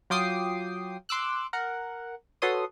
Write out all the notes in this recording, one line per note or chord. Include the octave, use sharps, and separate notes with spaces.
F#3 F4 G5 D6 D#6 C7
C6 D6 E6 F#6
A#4 F#5
F#4 A4 B4 C#5 C6 D#6